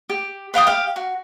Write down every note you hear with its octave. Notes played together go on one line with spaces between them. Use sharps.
G4
B4 F5 G5 D#6
G4 F5
F#4